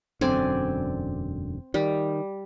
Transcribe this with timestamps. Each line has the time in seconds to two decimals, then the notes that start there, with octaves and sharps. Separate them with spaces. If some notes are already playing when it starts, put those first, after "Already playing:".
0.21 E1 F#2 D3 C4 D5 G#5
1.74 D#3 G3